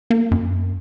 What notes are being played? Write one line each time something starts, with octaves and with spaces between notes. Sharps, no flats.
A#3
F#2